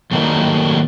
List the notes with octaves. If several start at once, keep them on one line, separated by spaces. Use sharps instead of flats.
D#3 F#3 G3 A3 A#3 D#4